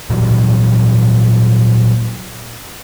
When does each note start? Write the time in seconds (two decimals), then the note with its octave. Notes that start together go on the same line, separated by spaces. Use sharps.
0.10 A#2 E3 F#3 G3